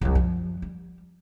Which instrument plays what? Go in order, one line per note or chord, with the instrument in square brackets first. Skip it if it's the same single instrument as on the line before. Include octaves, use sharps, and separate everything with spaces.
[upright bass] C2 F#3
F#2 F3
G3